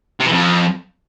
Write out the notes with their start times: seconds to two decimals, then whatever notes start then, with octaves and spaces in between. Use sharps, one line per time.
0.20 C3
0.26 E3
0.32 F2